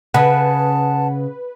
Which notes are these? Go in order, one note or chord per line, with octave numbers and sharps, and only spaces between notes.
C#3 B4 F#5 A5